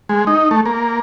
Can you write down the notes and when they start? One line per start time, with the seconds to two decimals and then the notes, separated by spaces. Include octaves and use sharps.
0.09 G#3
0.27 D#4
0.51 A3
0.66 A#3